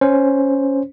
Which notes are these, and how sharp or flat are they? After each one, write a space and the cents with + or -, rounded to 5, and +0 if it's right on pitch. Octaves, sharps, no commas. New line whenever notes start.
C#4 +0 C5 +0